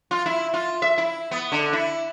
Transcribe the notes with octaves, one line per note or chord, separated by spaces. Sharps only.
F4
E4
F4
E5
E4
B3
D3
E4